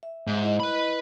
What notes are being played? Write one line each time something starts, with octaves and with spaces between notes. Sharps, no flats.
E5
G#2
E4 D#5
B4 B5